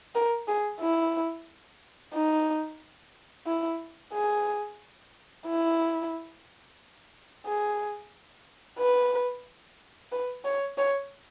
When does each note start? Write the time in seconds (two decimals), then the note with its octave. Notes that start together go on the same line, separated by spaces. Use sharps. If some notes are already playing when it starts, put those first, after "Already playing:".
0.15 A#4
0.48 G#4
0.80 E4
2.14 D#4
3.47 E4
4.13 G#4
5.46 E4
7.46 G#4
8.79 B4
10.12 B4
10.45 C#5
10.78 C#5